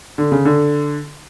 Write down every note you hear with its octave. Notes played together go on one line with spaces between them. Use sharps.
D3
C#3
D3